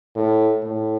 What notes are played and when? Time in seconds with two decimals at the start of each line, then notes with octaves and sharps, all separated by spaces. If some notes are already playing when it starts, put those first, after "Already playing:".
0.16 A2
0.63 A2